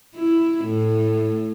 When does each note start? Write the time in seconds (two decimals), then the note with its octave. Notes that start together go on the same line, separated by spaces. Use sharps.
0.16 E4
0.66 A2